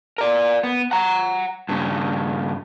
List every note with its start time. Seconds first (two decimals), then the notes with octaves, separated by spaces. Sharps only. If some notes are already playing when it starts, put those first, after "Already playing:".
0.18 A#4 D5
0.63 B3
0.91 F#5 A#5
1.69 G2 C#3